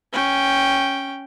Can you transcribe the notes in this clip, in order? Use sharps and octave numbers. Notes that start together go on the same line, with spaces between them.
C#4 G5